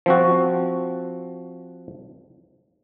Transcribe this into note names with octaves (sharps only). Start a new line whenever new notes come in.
F3 C4 F#4